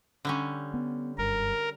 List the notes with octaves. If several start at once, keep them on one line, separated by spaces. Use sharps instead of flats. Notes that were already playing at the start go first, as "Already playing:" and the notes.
D3 G3 C#4
B3
F#1 G2 A#4